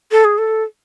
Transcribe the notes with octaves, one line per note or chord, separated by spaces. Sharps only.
A4
G#4
A4